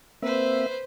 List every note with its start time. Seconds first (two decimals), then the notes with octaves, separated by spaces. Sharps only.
0.22 A#3 C4 B4 C5 E5